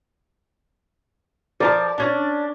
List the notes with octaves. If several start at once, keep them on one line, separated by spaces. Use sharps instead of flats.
F3 A#4 D5 A5
C#4 D4